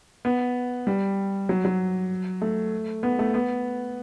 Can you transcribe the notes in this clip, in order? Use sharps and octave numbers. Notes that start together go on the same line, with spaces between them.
B3
G3
F#3
F#3
A3
B3
A3
B3